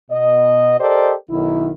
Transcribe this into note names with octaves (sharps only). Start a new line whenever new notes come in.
B2 D#5
G4 A4 A#4 C5 D5 D#5
B1 D#3 E4